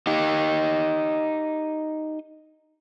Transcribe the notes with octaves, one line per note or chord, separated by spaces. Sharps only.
D#4 G4